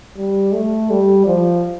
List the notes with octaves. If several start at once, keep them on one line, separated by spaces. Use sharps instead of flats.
G3
A3
G3
F3